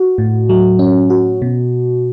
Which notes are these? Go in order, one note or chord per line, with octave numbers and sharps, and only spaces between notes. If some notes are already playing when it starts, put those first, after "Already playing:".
Already playing: F#4
A2
F#3
C#4
F#4
B2